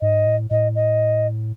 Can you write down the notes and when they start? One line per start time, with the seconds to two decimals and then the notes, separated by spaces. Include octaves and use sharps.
0.01 G#2 D#5
0.26 A2
0.51 A2 D#5
0.75 D#5